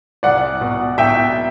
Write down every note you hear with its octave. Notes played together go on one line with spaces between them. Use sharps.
C2 D5 F#5
B2
B2 E5 G5